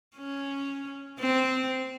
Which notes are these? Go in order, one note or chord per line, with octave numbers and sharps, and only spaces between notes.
C#4
C4